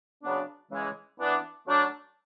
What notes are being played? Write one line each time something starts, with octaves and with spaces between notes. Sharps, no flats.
C#3 F#3 B3 D4
C#3 E3 G#3
E3 B3 D4
F#3 A3 D4